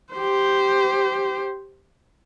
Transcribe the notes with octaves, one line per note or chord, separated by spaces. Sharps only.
G4 C5